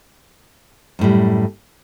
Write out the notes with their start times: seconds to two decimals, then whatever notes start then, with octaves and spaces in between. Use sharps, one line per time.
0.99 F#2
1.01 A2
1.04 G3